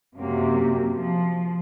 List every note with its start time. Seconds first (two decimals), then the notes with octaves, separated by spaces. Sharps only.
0.17 F#2 C3 A#3
0.96 F3